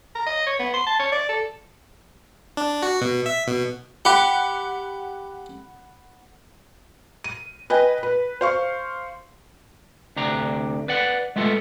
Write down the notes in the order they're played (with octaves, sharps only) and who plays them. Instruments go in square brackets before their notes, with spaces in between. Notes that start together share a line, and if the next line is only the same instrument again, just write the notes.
[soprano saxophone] A#5
D#5
C#5
B3
C6
A5
C#5
D5
A4
[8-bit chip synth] D4
F#4
B2
E5
B2
[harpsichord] G4 [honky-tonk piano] F#5 B5 F#6
[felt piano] D#7
B4 D#5 G5 G#5
B4
C5 F5 C#6
[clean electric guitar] D2 C3 D4 A#5
B4 D5 F#5
G#3 A3 B3 F4 A4